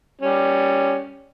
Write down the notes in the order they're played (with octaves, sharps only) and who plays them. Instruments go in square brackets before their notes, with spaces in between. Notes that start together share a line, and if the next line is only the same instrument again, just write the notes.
[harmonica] G3 C#4